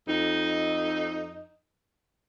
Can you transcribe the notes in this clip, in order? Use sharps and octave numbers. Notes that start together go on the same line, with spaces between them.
F2 D#4